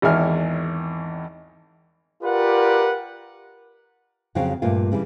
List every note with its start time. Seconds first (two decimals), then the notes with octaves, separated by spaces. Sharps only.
0.02 G#1 E2 D#3 E4 G#5 F6
2.23 F4 G4 A#4 B4 D5 F#5
4.35 F2 C#3 F#3 C#4 F5 G5
4.62 G2 A#2 A3 A#3 F4
4.92 C#3 E3 G3